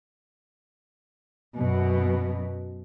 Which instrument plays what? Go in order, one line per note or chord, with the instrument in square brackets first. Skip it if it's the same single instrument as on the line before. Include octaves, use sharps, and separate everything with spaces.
[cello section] F#2 B2